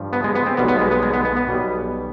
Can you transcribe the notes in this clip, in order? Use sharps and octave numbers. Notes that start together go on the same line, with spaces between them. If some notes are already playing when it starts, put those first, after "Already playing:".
Already playing: G2 F3
B3
G#3
B3
C4
B1 B2 G3 B3
B3
G#3
B3
G#3
B3
B3
B3
B1 B2 G3